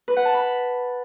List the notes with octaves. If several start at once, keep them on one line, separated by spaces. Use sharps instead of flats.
B4
F#5
A5
B5